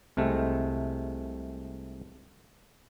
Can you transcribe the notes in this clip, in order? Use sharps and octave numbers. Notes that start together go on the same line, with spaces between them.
C2 C3 G#3 A3